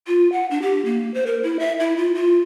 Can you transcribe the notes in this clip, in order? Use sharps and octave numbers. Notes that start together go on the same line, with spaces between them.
F4
F#5
D4
G4
A#3
C5
A#4
E4
E5
E4
F4
F4